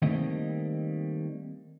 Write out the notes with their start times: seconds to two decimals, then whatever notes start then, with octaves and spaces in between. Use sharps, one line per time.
0.02 D#3 G3 A3 A#3 C4 D#5